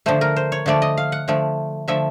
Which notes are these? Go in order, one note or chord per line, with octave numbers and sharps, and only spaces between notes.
D3 F3 A3 C5
A#4
C5
C#5
D3 F3 A3 D5
D#5
F5
F#5
D3 F3 A3
D3 F3 A3 E5